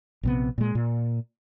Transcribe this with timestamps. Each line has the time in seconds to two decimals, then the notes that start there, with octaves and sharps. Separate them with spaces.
0.23 A#1 C3 B3
0.58 A#2 G#3
0.75 A#2